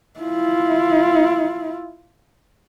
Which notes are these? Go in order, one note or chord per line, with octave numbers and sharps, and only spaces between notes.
E4 F4